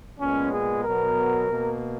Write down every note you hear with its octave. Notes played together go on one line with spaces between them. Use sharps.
A#2 G#3 B3 C#4
G#4
B2 F#3 B3 A#4
B2 A#3